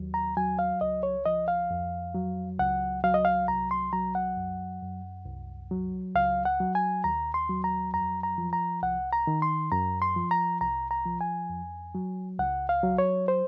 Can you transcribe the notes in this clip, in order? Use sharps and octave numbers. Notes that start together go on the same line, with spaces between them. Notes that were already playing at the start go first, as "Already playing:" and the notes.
Already playing: D#2 F#3
A#5
F#3 G#5
F5
C#2 D#5
C#5
F3 D#5
F5
F2
F#3
C#2 F#5
F#3 F5
D#5
F5
C2 A#5
C6
F#3 A#5
F#5
F#2
F#2
C2
F#3
C#2 F5
F#5
F#3
G#5
D#2 A#5
C6
F#3
A#5
F2 A#5
A#5
F3
A#5
C2 F#5
A#5
D#3
C6
F#2 A#5
C6
F3
A#5
C2 A#5
A#5
F3
G#5
F2
F#3
C#2 F#5
F5
F#3
C#5
C5